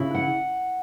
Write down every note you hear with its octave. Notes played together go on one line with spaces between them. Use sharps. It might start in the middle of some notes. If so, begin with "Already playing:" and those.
Already playing: C#3 E4
F#5